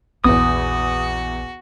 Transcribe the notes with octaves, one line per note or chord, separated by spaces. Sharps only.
A#1 E2 B3 D#4 F#4 D#6